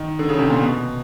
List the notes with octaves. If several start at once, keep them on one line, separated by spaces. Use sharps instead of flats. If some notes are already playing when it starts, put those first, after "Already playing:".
Already playing: D#3
D3
C#3
C3
A#2
B2